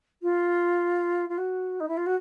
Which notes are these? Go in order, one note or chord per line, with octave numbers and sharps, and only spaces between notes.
F4
F4
F#4
D#4
E4
F4
F#4